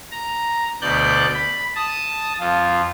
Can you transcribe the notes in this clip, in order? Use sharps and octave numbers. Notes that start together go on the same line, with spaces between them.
A#5
D2 B2 D5 F#6 G6
B5
A5 D#6
F2 F4